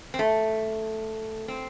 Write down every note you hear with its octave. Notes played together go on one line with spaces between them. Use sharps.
C4
A3
C4